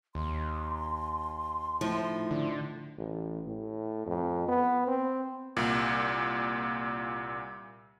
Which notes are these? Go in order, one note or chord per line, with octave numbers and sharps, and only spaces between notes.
D#2 C6
A2 F3 D#4
D3
A1
A2
F2
B3
C4
C2 A#2